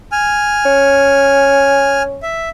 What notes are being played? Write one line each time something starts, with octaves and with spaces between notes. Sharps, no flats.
G#5 F6
C#4
E5